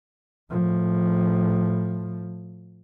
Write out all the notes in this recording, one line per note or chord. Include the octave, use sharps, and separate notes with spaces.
A2 F3